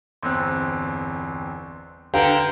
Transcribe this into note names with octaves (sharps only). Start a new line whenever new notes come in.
G1 E2 C4 C6 E6 F#6
D3 G4 B4 F5 G5 A#5 D7